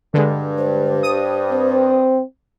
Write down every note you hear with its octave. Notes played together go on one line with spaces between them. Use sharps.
G2 D3 G#3
C5
D#6
C4